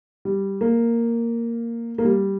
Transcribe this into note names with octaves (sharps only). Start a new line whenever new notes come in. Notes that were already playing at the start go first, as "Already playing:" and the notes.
G3
A#3
A#3
G3